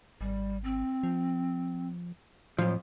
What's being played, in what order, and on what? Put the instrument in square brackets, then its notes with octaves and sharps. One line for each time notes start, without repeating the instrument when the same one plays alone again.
[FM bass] G#1 [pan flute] G3
[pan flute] C4
[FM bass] F3
[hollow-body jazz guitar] F2 F3 [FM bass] A2 [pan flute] F#3